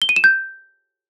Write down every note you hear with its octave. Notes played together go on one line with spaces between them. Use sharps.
G7
D#7
E7
G6